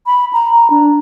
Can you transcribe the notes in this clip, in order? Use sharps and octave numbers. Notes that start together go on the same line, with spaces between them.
B5
A#5
A#5
D4